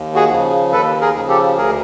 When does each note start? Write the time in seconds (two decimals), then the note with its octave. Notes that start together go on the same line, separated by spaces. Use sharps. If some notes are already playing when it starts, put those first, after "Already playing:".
Already playing: D#2
0.15 F#4 G#4
0.29 C#3 F3
0.72 D#2 A4 B4
1.01 G#4 A#4
1.15 C#3 F3
1.29 G4 A4
1.58 D2 G#4 A#4